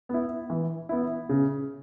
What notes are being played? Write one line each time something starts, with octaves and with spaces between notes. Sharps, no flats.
B3 E4
E3
B3 E4
C#3